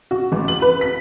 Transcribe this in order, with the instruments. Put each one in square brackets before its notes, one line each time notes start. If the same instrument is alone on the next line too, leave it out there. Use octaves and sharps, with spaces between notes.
[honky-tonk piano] F#4
A1
F#7
B4
B6